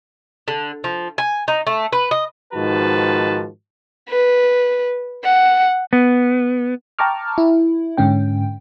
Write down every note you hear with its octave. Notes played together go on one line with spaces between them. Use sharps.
D3
F3
G#5
D#4
A3
B4
D#5
G#2 D#3 F3 F#4 B4 A5
B4
F#5
B3
G5 A5 A#5 C#6 D6 F6
E4
G#2 D3 C#4 G5